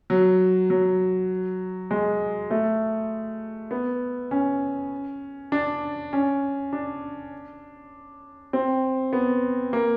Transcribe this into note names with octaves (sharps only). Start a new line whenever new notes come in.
F#3
F#3
G#3
A3
B3
C#4
D4
C#4
D4
C4
B3
A#3